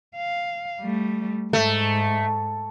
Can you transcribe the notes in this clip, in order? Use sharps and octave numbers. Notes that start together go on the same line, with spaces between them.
F5
G3 A3
G#2 A3